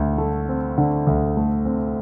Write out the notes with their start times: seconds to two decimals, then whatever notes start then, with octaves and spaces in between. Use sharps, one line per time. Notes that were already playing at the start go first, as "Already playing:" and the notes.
Already playing: D2 D3
0.18 A3
0.49 C4
0.78 D3
1.07 D2
1.37 A3
1.65 C4